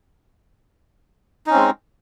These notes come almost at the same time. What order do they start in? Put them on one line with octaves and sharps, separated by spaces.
D#4 C#4 C4 G#3